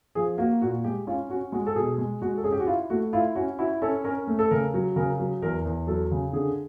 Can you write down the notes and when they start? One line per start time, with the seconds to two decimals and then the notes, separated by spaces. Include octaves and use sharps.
0.15 F3 G#4
0.38 A#3 F#4
0.62 A#2 F#4
0.84 G#3 G4
1.07 C#4 F4
1.30 C#4 F#4
1.52 G#3 F#4
1.67 A4
1.75 B2 G#4
1.98 G#3
2.22 G#3 F#4
2.37 A4
2.44 C#4 G#4
2.52 G4
2.60 F#4
2.67 E4 F4
2.90 A3 F#4
3.13 E4 F4
3.35 C#4 F#4
3.58 E4 F#4
3.82 C#4 A4
4.04 C#4 A#4
4.27 A3
4.39 A4
4.51 C#3 A#4
4.74 F#3
4.96 C#3 A#4
5.19 F#3
5.42 E2 A#4
5.65 E2
5.87 F#3 A4
6.11 C#3
6.33 D3 G#4